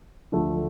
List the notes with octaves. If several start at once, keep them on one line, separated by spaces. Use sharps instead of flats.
D2 D3 F3 A3